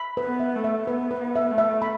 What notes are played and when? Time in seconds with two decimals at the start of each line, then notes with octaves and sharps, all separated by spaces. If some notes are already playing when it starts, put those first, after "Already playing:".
Already playing: B5
0.17 B4
0.24 B3
0.40 E5
0.55 A3
0.64 E5
0.87 B3 B4
1.11 B4
1.20 B3
1.36 E5
1.51 A3
1.58 E5
1.82 B5